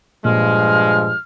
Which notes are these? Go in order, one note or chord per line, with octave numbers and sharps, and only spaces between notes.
G2 A#2 F3 G#3 F6